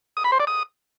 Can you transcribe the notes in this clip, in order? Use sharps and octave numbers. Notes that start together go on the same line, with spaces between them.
D#6
B5
C5
D5
D#6